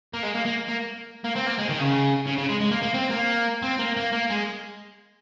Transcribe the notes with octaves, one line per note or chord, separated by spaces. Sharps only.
A#3
G#3
A#3
A#3
A#3
A#3
C4
A#3
G#3
D#3
C#3
C#3
C#3
G#3
G#3
A#3
A#3
C4
A#3
C4
A#3
A#3
A#3
G#3